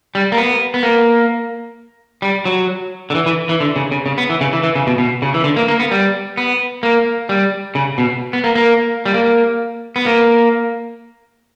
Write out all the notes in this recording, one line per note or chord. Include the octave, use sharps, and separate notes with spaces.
G3
A#3
B3
B3
A#3
G3
F#3
D3
E3
E3
E3
D3
C#3
C#3
C#3
B3
E3
C#3
E3
E3
C#3
B2
B2
C#3
E3
D3
A#3
A#3
B3
G3
B3
A#3
G3
C#3
B2
B3
A#3
A#3
G3
A#3
B3
A#3